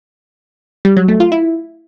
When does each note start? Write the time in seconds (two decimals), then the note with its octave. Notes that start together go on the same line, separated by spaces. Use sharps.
0.85 G3
0.97 F#3
1.08 A3
1.20 F4
1.32 E4